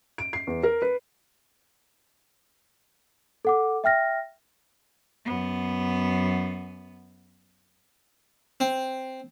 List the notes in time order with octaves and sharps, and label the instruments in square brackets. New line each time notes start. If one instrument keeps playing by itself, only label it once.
[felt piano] D7
C7
E2
A#4
B4
[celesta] A4 F#5 D6
E5 G5 F6 A#6
[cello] F#2 B3
[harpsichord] C4